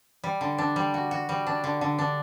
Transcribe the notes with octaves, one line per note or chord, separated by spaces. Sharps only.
G3
D3
D4
G3
F#4
F#4
G3
D4
D3
D3
D4